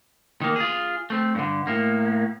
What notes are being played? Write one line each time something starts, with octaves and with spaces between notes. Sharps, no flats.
D#3 A#3
F4 G#4
A3 C4
G2 D3
A2 A#3